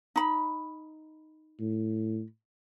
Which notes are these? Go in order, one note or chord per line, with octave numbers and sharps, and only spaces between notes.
D#4 B5
A2